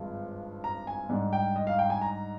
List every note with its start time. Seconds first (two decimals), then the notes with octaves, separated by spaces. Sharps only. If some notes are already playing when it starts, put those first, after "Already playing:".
Already playing: G#1 G2 F3 G#3
0.64 A#5
0.87 G#5
1.09 G#2 G3 D4
1.33 G5
1.56 D#5
1.67 F5
1.79 G5
1.90 G#5
2.02 A#5